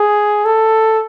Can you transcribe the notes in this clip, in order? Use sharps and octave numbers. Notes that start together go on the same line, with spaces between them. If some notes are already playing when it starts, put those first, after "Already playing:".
Already playing: G#4
A4